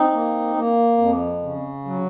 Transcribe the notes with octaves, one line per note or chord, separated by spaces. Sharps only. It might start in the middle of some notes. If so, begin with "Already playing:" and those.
Already playing: C4 D#4
A#3
A#3
F2
C#3
F#3